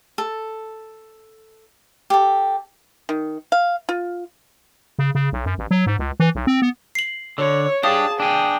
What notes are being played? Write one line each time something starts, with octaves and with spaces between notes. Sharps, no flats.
A4
G4 A4
D#3
F5
F4
C#3
C#3
B1
F#2
A1
F#3
G#2
C#2
E3
B1
C4
B3
C7 F#7
D3 C#5
D4 G4 G#4 F5 A5 D#6
D4 G#4 G5